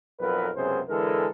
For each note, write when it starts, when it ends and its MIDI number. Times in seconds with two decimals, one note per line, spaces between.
0.19 0.49 35
0.19 0.49 41
0.19 0.49 54
0.19 0.49 70
0.19 0.49 71
0.56 0.80 37
0.56 0.80 42
0.56 0.80 48
0.56 0.80 59
0.56 0.80 68
0.56 0.80 72
0.88 1.26 50
0.88 1.26 52
0.88 1.26 56
0.88 1.26 69
0.88 1.26 70